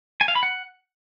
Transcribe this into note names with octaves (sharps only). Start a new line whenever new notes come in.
G#5
F5
B5
F#5